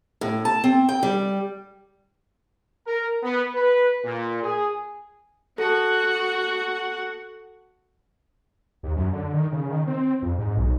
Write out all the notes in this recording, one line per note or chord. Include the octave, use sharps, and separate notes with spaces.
A2
A5
C4
G5
G3
A#4
B3
B4
A#2
G#4
F#4 A4 F#5 A5
D#2
F#2
D3
D#3
C#3
D#3
C4
F2
G#2
B1